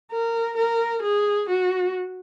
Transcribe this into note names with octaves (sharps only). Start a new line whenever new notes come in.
A#4
A#4
G#4
F#4